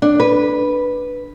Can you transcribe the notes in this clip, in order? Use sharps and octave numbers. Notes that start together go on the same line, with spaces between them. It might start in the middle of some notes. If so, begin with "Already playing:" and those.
D4
B4